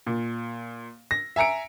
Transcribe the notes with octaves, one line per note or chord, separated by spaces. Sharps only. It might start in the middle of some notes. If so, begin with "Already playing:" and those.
A#2
A#6
E5 G#5 A#5 C#7 D7